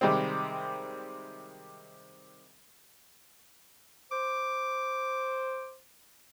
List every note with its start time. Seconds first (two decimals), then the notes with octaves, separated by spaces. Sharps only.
0.01 C3 D#3 G3 G#3 C4
4.12 C5 D6